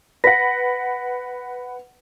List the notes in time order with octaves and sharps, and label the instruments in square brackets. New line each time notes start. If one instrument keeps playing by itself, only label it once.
[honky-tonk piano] B4 F#5 [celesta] A#6 B6